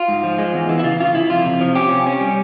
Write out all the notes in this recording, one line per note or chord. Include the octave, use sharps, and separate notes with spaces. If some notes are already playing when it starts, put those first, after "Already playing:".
Already playing: F4
G#2
F3
G#3
E2
E3
E4
C#3 F4
C#3 F4
C#3 E4
F2 F4
C3
F3
C#4 G4
C3
C#4
G3